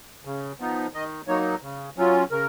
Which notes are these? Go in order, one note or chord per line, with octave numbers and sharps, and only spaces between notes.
C#3
F3 B3 D#4
D#3 D#5
F#3 A#3 D#4 C#5
C#3
F#3 C#4 F4
C#3 A#4